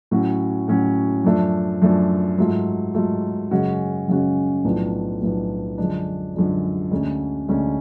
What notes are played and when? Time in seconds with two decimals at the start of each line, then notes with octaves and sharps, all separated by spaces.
0.11 A2 F#3 C#4 F#4
0.68 A2 F#3 C#4 F#4
1.24 F#2 F3 A3 D4
1.82 F#2 F3 A3 D4
2.38 G#2 F#3 A3 F4
2.95 G#2 F#3 A3 F4
3.51 F#2 C#3 G#3 C#4 F#4
4.07 F#2 C#3 G#3 C#4 F#4
4.64 B1 A2 F3 B3 D4
5.21 B1 A2 F3 B3 D4
5.78 F#2 D3 F3 G#3 D4
6.35 F#2 D3 F3 G#3 D4
6.91 D2 D3 G#3 C#4
7.49 D2 D3 G#3 C#4